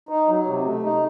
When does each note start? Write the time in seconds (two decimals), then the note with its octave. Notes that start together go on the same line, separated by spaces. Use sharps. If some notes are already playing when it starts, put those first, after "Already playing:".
0.09 D#4
0.28 F#3
0.46 C3
0.65 A3
0.83 D#4